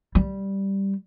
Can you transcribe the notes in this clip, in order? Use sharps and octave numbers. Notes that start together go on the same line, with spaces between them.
G3